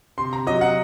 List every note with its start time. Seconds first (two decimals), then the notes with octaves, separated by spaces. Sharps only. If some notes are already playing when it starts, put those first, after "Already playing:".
0.18 C3 C6
0.33 A#5
0.47 F#3 D#5
0.61 F#5